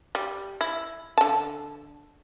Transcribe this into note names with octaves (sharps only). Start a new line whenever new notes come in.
G3
E4
D3 A5